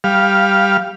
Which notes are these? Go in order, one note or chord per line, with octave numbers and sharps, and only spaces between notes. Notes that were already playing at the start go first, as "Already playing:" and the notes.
G3 F5